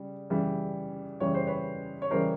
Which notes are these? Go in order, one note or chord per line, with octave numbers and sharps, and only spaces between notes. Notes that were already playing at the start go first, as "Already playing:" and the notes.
Already playing: C#3 G3
C#3 E3 G3
C#3 E3 G3 C#5
C5
B4 C#5
C#5
C#3 E3 G3 A#4 C5